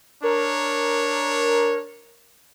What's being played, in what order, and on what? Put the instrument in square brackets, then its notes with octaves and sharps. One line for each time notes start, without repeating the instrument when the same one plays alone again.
[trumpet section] D4 C#5 [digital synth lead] A#4